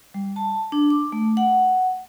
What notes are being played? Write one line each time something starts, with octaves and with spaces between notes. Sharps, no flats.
G3
A5
D4
D6
A3
F#5